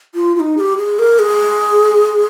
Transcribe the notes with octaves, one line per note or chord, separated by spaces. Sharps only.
F4
F4
D#4
G#4
G4
G#4
A#4
G#4